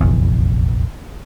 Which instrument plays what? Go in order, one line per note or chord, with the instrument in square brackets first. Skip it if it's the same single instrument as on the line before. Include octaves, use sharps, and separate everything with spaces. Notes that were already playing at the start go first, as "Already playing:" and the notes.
[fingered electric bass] F1 A#1 E2